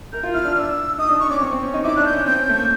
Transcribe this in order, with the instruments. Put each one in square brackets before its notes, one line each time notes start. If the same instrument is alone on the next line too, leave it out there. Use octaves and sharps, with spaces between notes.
[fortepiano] A#4 [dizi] G6
[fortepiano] F4
[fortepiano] E4 [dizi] F6
[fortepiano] D4
[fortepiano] D4 [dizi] F6
[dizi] E6
[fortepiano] D#4 [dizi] D#6
[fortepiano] D4
[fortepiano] D4 [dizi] C#6
[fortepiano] C#4 [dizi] D6
[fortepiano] C4 [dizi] C#6
[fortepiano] C4
C#4
D#4
[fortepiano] E4 [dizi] D6
[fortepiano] D4 [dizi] F#6
[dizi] G6
[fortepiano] C#4
[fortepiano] C4 [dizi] G6
[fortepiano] C#4
A3
A#3